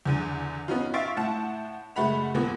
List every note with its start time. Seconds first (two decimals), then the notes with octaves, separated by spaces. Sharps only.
0.06 E2 D3 D#7
0.68 B3 C#4 D#4 F4
0.94 E5 F5 C6 C#6 A6 D7
1.17 A2 F#5 A5
1.96 F#1 G#3 A3 F#5 B5 F7
2.34 D#2 A#2 A#3 B3